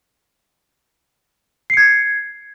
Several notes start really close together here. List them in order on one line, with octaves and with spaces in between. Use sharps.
C7 C#7 G#6